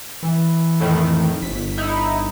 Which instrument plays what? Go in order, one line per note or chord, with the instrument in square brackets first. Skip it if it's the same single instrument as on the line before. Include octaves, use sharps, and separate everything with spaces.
[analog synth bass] E3
[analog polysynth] F2 A2 D#3
[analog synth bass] G1 [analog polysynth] B6
[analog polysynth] D#4 E4